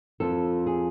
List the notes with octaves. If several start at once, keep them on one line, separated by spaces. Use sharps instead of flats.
F2 F3 A4
G#4